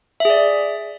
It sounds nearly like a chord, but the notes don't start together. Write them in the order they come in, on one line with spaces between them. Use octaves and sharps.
E5 G#4 D5